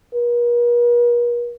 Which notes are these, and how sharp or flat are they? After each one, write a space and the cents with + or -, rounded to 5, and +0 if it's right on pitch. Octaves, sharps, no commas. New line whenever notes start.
A#4 +45